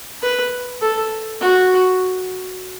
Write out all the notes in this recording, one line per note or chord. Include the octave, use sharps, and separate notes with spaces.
B4
A4
F#4